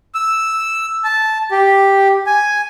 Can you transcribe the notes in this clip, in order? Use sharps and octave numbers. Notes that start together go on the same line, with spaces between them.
E6
A5
G4
G#5